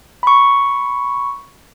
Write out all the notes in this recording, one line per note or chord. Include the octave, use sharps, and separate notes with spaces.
B5 C#6